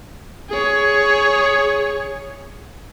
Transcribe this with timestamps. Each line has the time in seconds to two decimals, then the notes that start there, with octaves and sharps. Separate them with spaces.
0.49 G#4 C#5